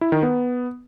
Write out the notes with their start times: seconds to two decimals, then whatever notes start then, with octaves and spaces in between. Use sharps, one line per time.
0.01 E4
0.12 D#3
0.23 B3